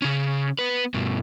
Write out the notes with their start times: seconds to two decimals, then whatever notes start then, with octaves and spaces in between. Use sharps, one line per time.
0.02 C#3 C#4
0.59 B3 B4
0.94 G2 B2